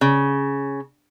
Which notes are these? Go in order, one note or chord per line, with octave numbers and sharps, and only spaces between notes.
C#3